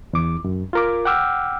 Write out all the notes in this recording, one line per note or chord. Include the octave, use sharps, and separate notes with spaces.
E2 D6
F#2
F4 A#4 D6
F#5 G5 D6 E6 F6